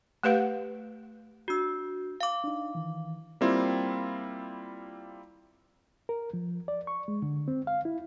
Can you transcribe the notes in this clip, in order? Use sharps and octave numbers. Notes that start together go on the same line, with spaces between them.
A3 G4 B4 F5 F#5
D4 F#4 E6 G6
F5 D6
D4 D#4
D#3 E3
G3 A#3 C4 E4 F4
A#4
F3
D5
C#6
G#3
D3
C4
F5
E4